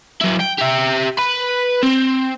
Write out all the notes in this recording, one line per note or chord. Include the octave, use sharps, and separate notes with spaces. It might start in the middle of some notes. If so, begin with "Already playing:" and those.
F#3 E4
G5
G4 E5
B4 B5
C4